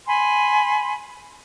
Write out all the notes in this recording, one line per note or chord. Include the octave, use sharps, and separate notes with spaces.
G#5 B5 C6